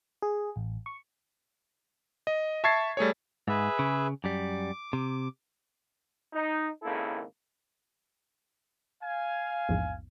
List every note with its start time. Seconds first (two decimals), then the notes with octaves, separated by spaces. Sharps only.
0.22 G#4
0.56 A1
0.86 C#6
2.27 D#5
2.64 E5 A5 C#6 G#6 A6 C7
2.97 G3 A3 G#4 C#5
3.48 G#2 G#4 B4 E5
3.79 C#3
4.24 F#2 G3 D6
4.93 C3
6.33 D#4
6.82 G#1 C#3 A#3 E4 A4
9.02 F5 G#5
9.69 A#1 E2 G#2